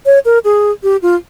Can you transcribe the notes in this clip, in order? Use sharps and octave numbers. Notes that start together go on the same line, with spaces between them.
C#5
A#4
G#4
G4
F4